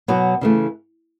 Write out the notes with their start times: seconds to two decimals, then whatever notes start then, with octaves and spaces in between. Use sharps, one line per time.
0.08 B2 F#3 B3 F#4
0.41 C#3 E3 A3